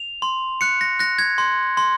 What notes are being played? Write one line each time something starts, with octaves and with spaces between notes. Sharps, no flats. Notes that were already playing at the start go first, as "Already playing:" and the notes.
Already playing: F7
C6
F#6 C#7
A#6
F#6 A#6
G#6
C6
C6